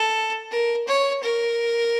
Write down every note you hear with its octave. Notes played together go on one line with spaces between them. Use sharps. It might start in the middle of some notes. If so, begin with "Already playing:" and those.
Already playing: A4
A#4
C#5
A#4